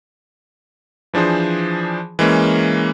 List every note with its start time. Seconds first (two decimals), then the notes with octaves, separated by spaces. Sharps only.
1.14 E3 F3 D4 G#4 C5
2.19 E3 G#3 A#3 C#4